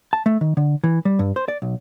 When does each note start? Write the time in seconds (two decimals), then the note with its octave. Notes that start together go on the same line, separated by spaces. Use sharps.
0.13 A5
0.26 A3
0.41 D#3
0.57 D3
0.84 E3
1.05 G3
1.19 G2
1.36 C5
1.48 D5
1.62 B1